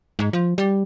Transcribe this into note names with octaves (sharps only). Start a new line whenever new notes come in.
G#2
F3
G3